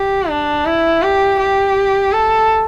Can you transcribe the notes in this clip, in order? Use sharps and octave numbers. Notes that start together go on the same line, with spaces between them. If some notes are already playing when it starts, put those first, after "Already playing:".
Already playing: G4
D4
E4
G4
G4
A4